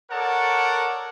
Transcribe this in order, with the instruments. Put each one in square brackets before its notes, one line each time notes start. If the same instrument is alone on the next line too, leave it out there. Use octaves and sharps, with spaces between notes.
[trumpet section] A4 A#4 C#5 D5 F#5 A5